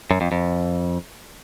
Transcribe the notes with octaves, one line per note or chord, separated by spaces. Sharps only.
F#2
F2
F2